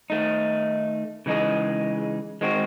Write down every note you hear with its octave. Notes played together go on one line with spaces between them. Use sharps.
D#3 A3 D#4
C#3 E3 G#3 D#4 G#4
D#3 G#3 C4 F#4